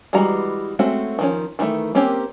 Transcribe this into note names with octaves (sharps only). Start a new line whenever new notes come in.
E3 G3 G#3 F#4 A#5
G#3 A3 C4 C#4 F#4
D#3 F3 C#4
D#3 E3 G#3 A3
A#3 C4 C#4 G4 A#4